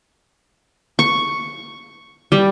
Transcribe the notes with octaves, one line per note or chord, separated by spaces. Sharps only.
C#6
G3